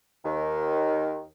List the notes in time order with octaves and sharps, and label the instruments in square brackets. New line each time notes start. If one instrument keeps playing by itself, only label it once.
[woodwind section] D#2 D#3